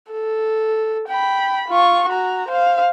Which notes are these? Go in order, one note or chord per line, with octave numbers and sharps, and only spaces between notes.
A4
G5 B5
F4 C#6
F#4 A#5
C5 F5